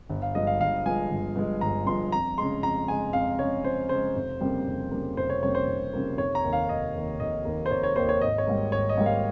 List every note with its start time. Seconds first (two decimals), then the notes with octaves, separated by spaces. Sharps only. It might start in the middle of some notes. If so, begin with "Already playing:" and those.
0.09 G1
0.22 F5
0.35 G2 F3 G#3 D#5
0.47 F5
0.60 G1 F5
0.86 G2 F3 G#3 G#5
1.11 G1
1.36 G2 F3 G#3
1.61 G1 A#5
1.86 G2 F3 G#3 C6
2.12 F2 A#5
2.37 C#3 G#3 C6
2.63 F2 A#5
2.88 C#3 G#3 G#5
3.13 F2 F5
3.39 C#3 G#3 C#5
3.65 F2 C5
3.89 C#3 G#3 C5
4.16 F1
4.41 F2 C#3 G3 A#3
4.66 F1
4.91 F2 C#3 G3 A#3
5.17 F1 C5
5.30 C#5
5.43 F2 C#3 G3 A#3 C#5
5.55 C5
5.68 F1
5.93 F2 C#3 G3 A#3
6.18 F1 C#5
6.35 A#5
6.44 D#2 D#3 A#3
6.53 F5
6.69 F1 D#5
6.94 D#2 D#3 A#3
7.20 F1 D#5
7.45 D#2 D#3 A#3
7.66 C5
7.71 F1 C#5
7.83 C#5
7.96 D#2 D#3 A#3 C5
8.09 C#5
8.21 G#1 D#5
8.38 C#5
8.47 G#2 G3 A#3
8.72 G#1 C#5
8.89 D#5
8.98 G#2 G3 A#3
9.06 F5